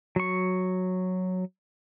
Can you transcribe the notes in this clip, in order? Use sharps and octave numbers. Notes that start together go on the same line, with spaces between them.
F#3 C#6